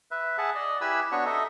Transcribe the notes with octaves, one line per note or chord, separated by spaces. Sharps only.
B4 E5
G#4 E5 F#5 A5
D5 D#5
E4 G4 B4 G#5 B5 E6
B3 D4 F#4 C#5 C#6
D#4 A4 D#5 E5